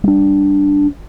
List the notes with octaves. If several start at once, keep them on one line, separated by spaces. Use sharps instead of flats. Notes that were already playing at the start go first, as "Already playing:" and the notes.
G3 D4